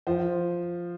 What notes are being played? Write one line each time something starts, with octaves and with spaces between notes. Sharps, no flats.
F3 C5